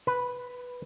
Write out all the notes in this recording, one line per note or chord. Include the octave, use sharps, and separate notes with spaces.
B4